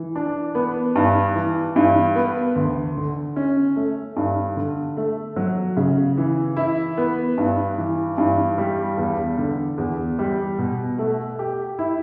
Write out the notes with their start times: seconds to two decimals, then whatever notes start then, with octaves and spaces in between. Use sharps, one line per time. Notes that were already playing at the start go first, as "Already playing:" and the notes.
Already playing: E3
0.16 D4
0.55 B3
0.95 G2
1.35 E3
1.76 G2
2.16 B3
2.56 D2
2.96 D3
3.36 C#4
3.76 A3
4.16 G2
4.56 D3
4.97 A3
5.36 F#3
5.77 C#3
6.17 E3
6.57 E4
6.97 B3
7.38 G2
7.78 E3
8.18 G2
8.58 G3
8.97 E2
9.38 D3
9.78 E2
10.19 G3
10.58 B2
10.99 A3
11.39 G4
11.79 E4